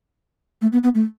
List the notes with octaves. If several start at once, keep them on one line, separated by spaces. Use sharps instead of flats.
A3
B3
B3
A3